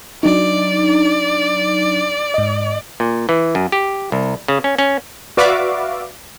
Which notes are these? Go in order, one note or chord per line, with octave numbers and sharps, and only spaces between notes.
F#3 D4 D#4 D5
G#2 D#5
A#2
E3
F#2
G4
C2
C#3
C#4
C#4
F#4 B4 D5 E5 F5 D6